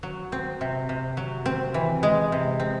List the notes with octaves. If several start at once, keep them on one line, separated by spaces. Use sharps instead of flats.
F#3
C4
C3
C3
F#3
C4
E3
G#3
C3
C4